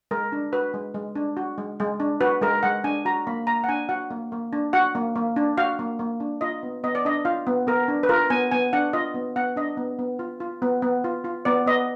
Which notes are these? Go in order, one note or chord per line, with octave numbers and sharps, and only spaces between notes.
G#3 A#4
D4
F#4 B4
G#3
G#3
D4
F#4
G#3
G#3
D4
F#4 B4
G#3 A#4
G#3 F#5
D4 G#5
F#4 A#5
A#3 B5
A#3 A#5
F#5
D4 G#5
F#4 F#5
A#3
A#3
D4
F#4 F#5
A#3
A#3
D4
F#4 F5
A#3
A#3
D4
F4 D#5
B3
B3 D#5
D5
D4 D#5
F4 F5
B3
B3 A#4
D4
B4
F4 A#4
B3 G#5
B3 G#5
D4 F#5
F4 D#5
B3
B3 F#5
D4 D#5
B3
B3
F4
F4
B3
B3
F4
F4
B3 D5
B3 D#5